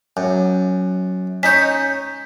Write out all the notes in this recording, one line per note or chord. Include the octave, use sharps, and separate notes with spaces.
F#2
C#4 D#4 C#5 G6 B6